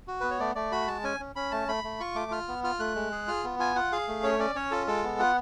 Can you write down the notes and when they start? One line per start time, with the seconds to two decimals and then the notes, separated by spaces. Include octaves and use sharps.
0.08 F#4
0.20 B3 B4
0.30 C#5
0.40 A3 D5
0.55 A3 D5
0.72 F#4 B5
0.87 G#3 A5
1.04 C#4 G#5
1.20 C#4
1.36 C#4 B5
1.51 A3 A5
1.68 A3 B5
1.84 A3
2.00 F4 C#6
2.15 A3 D6
2.31 F4 F6
2.48 B3
2.64 F4 F6
2.79 A3 F#6
2.95 G#3
3.12 G#4
3.28 F4 F6
3.44 B3
3.59 F4 G#5
3.75 F4 F#5
3.92 G#4 F5
4.08 A3
4.23 C#4 C#5
4.39 C#4 D5
4.55 C#4 C#5
4.71 F4 A4
4.87 G#3 A4
5.04 B3
5.19 F4 F#5